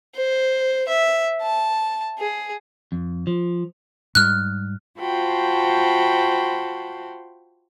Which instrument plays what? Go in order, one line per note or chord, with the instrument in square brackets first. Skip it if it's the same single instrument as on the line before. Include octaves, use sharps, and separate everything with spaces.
[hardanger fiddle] C5
E5
A5
G#4
[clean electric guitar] F2
F3
[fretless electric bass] G#2 G3 [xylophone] F6 F#6
[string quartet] F4 F#4 C5 G5 A5 B5